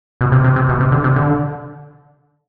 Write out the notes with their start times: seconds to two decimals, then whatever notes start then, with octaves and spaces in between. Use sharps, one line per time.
0.21 B2
0.32 C3
0.44 C3
0.56 C3
0.69 B2
0.80 C3
0.92 D3
1.04 C3
1.16 D3